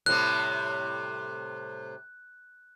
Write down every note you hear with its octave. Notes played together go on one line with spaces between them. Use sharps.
A2 C3 G3 F#6